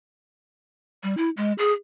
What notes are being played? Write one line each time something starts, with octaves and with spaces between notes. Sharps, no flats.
G3
E4
G#3
G#4